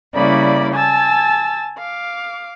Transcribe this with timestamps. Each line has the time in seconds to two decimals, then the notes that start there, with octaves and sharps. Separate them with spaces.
0.14 C#3 G3 A#3 E4 D5 B5
0.73 G#5 A5 E6 A6
1.79 F5 D6